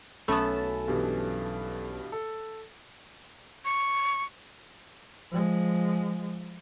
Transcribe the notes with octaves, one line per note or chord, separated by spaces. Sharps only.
B1 A3 B3 C#4 A4 A5 B5
G2 B2 E3
A4
C#6
F3 G#3